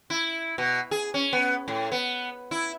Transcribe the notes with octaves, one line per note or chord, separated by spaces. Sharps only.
E4
B2
G#4
C#4
B3
A2
B3
E4